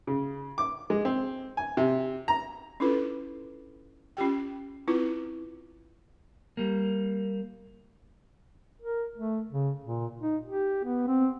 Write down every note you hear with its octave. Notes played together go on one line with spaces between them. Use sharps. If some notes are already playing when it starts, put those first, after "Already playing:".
C#3
D6
G#3
C4
G#5
C3
A#5
C#4 D4 E4 F4 A4 B4
C#4 F4 G4 G5
C4 E4 F4 B4
G3 A#3
A#4
A3
C#3
A#2
D#4
G4
B3
C4